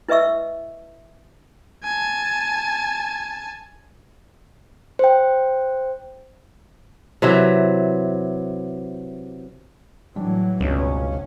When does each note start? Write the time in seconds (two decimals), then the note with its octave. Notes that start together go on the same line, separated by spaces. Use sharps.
0.08 E4 B4 D#5 E5 C#6 E6
1.84 G#5 A5
4.99 C5 G5
7.22 C3 E3 F#3 E5
10.16 A2 E3 F#3 G3 D4
10.60 F1 C#2 G2 B2 C#4